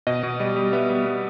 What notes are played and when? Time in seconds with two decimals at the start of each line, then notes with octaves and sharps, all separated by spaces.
0.07 B2 D#5
0.23 B2
0.40 G3
0.56 G3
0.73 B3 E5
0.90 G3
1.06 B3